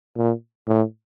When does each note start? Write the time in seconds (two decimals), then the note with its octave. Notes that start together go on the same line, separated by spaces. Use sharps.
0.16 A#2
0.67 A2